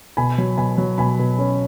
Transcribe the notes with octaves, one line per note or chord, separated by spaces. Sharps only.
B2 G#5 B5
F#3
B2 G#5 B5
F#3
B2 G#5 B5
B2
C#4